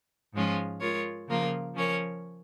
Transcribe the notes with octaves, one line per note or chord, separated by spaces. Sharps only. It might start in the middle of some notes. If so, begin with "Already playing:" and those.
G#2 F3 G#3 C#4 F4
G#3 F4 A#4 C#5
C#3 F3 A#3 F4 A#4
F3 C#4 A#4 C#5